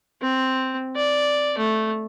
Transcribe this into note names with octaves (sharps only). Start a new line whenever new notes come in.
C4
D5
A3